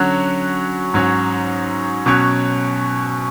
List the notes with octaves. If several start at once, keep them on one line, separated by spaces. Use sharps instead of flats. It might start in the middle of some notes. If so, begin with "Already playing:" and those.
Already playing: D3 F#3 C#4 F#4
G#2 F#3 C#4
B2 F#3 C#4